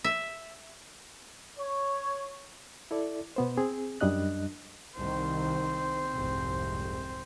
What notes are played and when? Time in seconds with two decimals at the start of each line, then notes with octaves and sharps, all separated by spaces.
0.04 E5
1.57 C#5
2.91 E4 A4 D5
3.36 B2 B3 C5
3.57 C4 G#4
4.01 F#2 G3 D4 D#5 F#6
4.96 C2 D#3 C4 C5
6.13 F1 C2 G#2